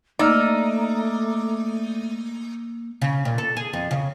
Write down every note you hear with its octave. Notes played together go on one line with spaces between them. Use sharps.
A3 A#3 D#4 D5 E6 F6
C#3
A#2
A4
G#4
F2
C#3